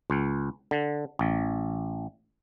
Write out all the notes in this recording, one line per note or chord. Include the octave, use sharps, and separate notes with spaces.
C#2
D3
A1